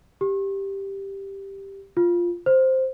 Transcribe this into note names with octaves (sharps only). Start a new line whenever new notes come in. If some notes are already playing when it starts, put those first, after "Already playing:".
G4
F4
C5